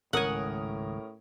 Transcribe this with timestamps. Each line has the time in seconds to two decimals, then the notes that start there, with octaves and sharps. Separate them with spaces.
0.13 G#1 C#2 A2 C#4 A#4 F#5 G#5 D#6